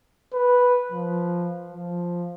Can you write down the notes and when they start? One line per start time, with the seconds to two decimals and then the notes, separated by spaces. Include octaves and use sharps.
0.33 B4
0.92 F3
1.73 F3